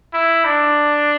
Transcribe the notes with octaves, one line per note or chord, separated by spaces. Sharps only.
E4
D4